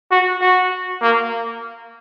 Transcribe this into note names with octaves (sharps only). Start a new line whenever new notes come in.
F#4
F#4
A#3